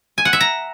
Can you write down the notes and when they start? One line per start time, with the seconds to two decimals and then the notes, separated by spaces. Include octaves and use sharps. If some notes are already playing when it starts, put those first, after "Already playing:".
0.18 G#5
0.25 F#5
0.33 E5
0.41 A#5